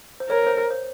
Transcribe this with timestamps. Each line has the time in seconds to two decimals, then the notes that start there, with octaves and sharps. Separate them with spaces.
0.20 C5
0.30 A#4 C#5
0.47 C5
0.71 C5